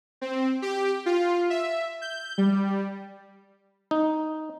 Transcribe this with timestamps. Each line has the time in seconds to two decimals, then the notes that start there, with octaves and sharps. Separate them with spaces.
0.21 C4
0.62 G4
1.06 F4
1.50 E5
2.02 G6
2.38 G3
3.91 D#4